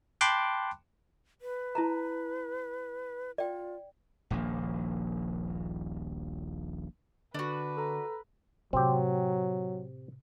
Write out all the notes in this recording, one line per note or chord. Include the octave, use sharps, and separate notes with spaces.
G5 A5 B5 C6 D6 F#6
B4
E4 A5 A#5
F4 D5 G5
D#1 A#1 F3 A#3
D3 D4 F#4 B4
A4 A#5
A2 C3 F#3 C4 G4